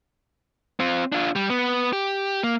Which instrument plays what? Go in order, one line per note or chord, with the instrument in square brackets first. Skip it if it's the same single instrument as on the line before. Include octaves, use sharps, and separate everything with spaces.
[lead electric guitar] C4 F4
D4 F4
G3
B3
G4
A#3